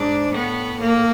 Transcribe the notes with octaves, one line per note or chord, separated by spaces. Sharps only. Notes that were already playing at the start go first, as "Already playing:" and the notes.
Already playing: G#2 D4
A2 B3
A#3